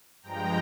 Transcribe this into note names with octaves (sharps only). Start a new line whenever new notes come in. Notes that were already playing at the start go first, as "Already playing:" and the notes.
G2 F3 G#3 G5 A#5